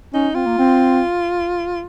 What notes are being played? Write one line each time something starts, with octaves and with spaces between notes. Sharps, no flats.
C#4 D#4
C4 F4
A#3
C4